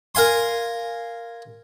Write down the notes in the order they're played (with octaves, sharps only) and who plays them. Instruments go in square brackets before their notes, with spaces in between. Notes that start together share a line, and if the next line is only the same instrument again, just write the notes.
[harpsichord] A#4 F5 G#5 C6